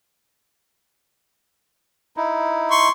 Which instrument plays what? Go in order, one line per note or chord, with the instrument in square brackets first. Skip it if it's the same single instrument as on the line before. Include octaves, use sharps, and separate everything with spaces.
[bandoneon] D#4 E4
[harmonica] C6 C#6